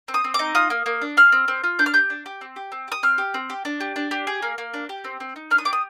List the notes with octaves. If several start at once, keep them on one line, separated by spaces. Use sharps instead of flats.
C4
D#6
C4
D6
D#4
F4 D#6
A#3
A#3
D4
G#4 F6
C4
C4
F4
D4 G6
F6
G4 G6
D4
G4
C4
G4
C4
G4 D#6
C4 F6
G4
C4
G4
D4
G4
D4
G4
G#4
A#3
A#3
D4
G4
C4
C4
D#4
D4 F6
D#6
G4 D6
D#6